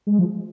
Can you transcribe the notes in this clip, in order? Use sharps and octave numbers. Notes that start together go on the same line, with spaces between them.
G#3
F3